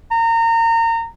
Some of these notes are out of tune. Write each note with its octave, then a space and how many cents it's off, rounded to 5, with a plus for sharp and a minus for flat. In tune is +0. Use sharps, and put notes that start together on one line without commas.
A#5 -30